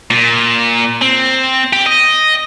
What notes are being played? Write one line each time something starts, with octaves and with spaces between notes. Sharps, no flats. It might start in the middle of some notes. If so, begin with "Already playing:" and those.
A#2
C4
G4
D#5